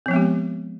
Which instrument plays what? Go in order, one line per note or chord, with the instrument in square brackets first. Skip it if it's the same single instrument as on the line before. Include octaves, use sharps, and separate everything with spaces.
[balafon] C4
F3
B3
G#3
G4